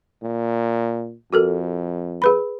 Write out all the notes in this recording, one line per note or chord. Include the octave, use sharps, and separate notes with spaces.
A#2
F2 F#4 A4 A#4
G#4 B4 B5